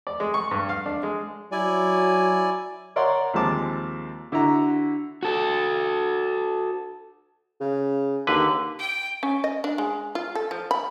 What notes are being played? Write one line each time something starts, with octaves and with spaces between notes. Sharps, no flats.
D5
G#3
C#6
G2
F5
D4
G#3
F#3 E4 D5 G#5
A#4 C#5 D5 F#5 C6
D#2 F3 G#3 C4 A5 D6
D3 E4 F#4 A#5
F#4 A4
C#3
D#2 D3 B4
G5
C#4
D#5
D4
G#3
F4
A4
F3
B5